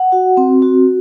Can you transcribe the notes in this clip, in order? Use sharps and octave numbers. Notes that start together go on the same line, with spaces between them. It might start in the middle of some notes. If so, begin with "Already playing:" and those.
Already playing: F#5
F#4
C4
F#4